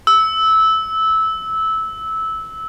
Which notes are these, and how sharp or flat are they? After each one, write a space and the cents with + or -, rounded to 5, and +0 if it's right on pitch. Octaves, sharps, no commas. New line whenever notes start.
E6 -15